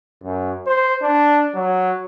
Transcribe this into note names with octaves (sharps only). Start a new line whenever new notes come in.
F#2
C5
D4
F#3